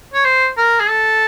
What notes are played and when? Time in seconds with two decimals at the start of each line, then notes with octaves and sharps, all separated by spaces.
0.14 C#5
0.25 C5
0.57 A#4
0.80 G#4
0.90 A4